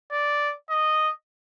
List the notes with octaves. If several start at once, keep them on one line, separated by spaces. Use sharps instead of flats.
D5
D#5